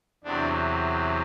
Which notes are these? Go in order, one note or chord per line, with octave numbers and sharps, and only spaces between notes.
E2 C3 F#3 D4